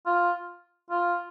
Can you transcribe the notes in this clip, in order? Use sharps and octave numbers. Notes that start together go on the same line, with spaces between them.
F4
F4